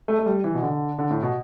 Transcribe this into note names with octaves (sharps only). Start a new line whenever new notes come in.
A3
A3
G3
E3
B2
D3
D3
A2
B2